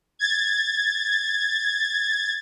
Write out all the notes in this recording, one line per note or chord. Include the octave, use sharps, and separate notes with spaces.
G#6 A6